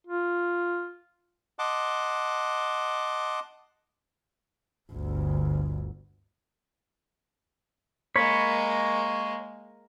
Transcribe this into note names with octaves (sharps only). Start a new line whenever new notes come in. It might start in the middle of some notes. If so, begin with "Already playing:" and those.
F4
D#5 F#5 A5 C6 D6
G1 D2
G#3 A#3 C#5 B5